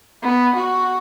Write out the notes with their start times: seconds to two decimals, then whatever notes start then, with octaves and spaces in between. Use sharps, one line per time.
0.23 B3
0.56 F#4